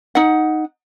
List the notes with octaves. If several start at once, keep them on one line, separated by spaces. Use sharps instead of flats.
D#4 F#5